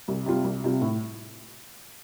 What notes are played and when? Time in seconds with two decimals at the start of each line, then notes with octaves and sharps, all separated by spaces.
0.08 C2
0.26 C3 G3 F4
0.44 C2
0.64 C3 G3 F4
0.81 A2